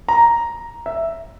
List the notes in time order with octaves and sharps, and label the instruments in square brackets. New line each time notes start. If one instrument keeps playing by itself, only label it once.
[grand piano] A#5
E5